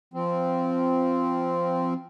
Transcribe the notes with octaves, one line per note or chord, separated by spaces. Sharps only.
F3 C4